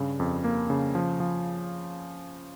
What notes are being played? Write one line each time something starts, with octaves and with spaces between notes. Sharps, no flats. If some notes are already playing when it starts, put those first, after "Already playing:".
Already playing: G2 C#3
F2
A#3
C#3
F3
F3